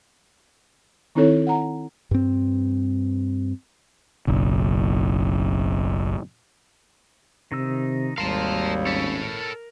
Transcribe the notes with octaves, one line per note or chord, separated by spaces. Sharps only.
D#3 C4 D#4 E4 A4 C#5
F#5 A#5
G2 C4
F#1 B1
C3 D#3 D#4 E6
G#1 D#2 G3 A#4 F5 A5 A#5 C6
C#4 A4 C#5
A#4